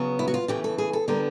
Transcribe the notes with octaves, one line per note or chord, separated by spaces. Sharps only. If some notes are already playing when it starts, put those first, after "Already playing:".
Already playing: C#3 F#3 B3
E4
F#4
F4
C#3 E3 A3 G4
A4
G#4
A4
D3 G3 B3 A#4